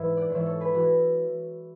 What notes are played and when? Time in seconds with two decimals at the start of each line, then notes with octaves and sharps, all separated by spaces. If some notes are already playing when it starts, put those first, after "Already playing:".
Already playing: G#2 E3 B4 E5
0.17 D5 F#5
0.30 G#2 E3 C#5 E5
0.46 A4 C#5
0.60 G#4 B4
0.74 E3 F#4